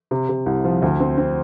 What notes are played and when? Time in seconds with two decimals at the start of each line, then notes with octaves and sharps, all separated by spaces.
0.11 C3
0.29 C3
0.46 C2
0.64 F3
0.82 D2
1.00 C4
1.18 C4